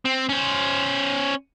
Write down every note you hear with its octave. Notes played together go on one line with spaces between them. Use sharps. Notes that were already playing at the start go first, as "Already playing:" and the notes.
C4
C#4 C5